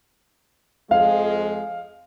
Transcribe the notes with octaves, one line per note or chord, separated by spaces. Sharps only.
F2 F3 G#3 F5